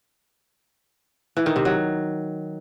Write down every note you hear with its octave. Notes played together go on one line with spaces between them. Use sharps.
E3
D#3
C3
F#3